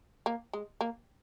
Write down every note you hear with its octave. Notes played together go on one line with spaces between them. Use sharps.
A#3
G#3
A#3